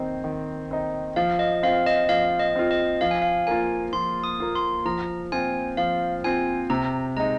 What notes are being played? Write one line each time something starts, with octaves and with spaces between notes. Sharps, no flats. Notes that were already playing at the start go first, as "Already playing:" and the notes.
Already playing: D#3 C4 D#4
D#3
C4 D#4
F3 F5
D#5
C4 F4 F5
D#5
F3 F5
D#5
C4 F4
D#5
F3 F5
G#5
F5
A#3 F4 G#5
F3 C6
D#6
A#3 F4
C6
F3 A#5
C4 F4 G#5
F3 F5
C4 F4 G#5
C3 A#5
G#3 D#4 A#5